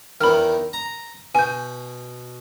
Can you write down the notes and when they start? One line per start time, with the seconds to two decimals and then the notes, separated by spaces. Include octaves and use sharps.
0.21 E2 D#3 B5 F6
0.73 A#5
1.35 B2 G#5 G6